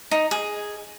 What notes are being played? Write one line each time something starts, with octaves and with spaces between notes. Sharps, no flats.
D#4
G#4